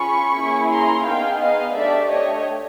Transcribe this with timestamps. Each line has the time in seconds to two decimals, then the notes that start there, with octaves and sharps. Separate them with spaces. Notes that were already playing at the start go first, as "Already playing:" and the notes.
Already playing: C#4 F4 G#4 B5 C#6
0.36 A#3 C#4 E4 G#4
0.71 A#5 C6
1.06 B3 D#4 G#4 F5 G5
1.41 D#5 F5
1.76 A3 D4 G4 D5 E5
2.11 C#5 D#5